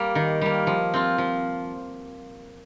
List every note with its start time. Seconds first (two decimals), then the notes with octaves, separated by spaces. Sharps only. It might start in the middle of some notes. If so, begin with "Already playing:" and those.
Already playing: G3 A#3
0.15 D#3
0.41 G3 A#3
0.67 F3
0.94 C4 F4
1.18 F3